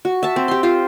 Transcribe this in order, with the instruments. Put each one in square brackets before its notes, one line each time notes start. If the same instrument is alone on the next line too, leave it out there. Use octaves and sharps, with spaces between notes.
[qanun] F#4
E5 A5
C4
G4 C6
F4 G4 C5